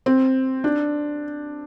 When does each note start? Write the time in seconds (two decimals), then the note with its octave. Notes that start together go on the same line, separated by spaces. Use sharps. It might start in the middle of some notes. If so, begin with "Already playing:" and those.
0.06 C4
0.64 D4